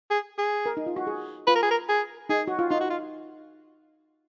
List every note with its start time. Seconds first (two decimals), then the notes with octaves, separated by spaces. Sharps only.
0.11 G#4
0.38 G#4
0.66 A#4
0.77 D#4
0.86 F4
0.96 F#4
1.07 G#4
1.47 F4 B4
1.55 A#4
1.63 G#4
1.71 A#4
1.89 G#4
2.29 D#4 G#4
2.47 F#4
2.59 F4
2.71 D#4 F4
2.81 F#4
2.90 F4